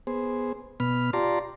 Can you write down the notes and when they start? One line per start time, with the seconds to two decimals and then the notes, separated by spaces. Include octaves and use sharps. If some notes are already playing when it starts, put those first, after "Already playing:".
0.07 B3 G#4 C5
0.80 B2 B3 B5 F6
1.13 F4 G4 D5 A5 A#5 C6